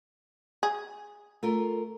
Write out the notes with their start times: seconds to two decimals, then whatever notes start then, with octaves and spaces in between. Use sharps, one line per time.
0.63 G#4
1.43 A3 F4 A#4